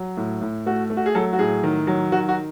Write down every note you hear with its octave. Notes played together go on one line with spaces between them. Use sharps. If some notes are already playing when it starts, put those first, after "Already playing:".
Already playing: F#3
A2
A2
A3 F#4
A3
F#4
G#4
F#3 A4
F#4
A2 G#4
D#3
F#3
D#3 F#4
F#4